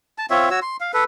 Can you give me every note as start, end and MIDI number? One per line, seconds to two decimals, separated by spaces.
0.18 0.26 81
0.30 0.49 60
0.30 0.49 65
0.30 0.49 73
0.30 0.49 76
0.51 0.60 66
0.51 0.60 73
0.51 0.60 88
0.62 0.77 84
0.81 0.92 77
0.94 1.04 69
0.94 1.04 71